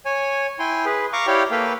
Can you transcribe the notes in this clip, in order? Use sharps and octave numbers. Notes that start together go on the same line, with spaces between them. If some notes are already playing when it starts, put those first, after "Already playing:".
C#5 G#5
E4 G5 G#5 C6
G#4 B4
F5 A#5 C#6 D6
E4 G4 C#5 D5 F5 G5
A#3 A4 B4 F5 G5